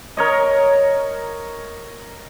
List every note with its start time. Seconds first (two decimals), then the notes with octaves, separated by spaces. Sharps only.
0.17 A#4 C#5 D#5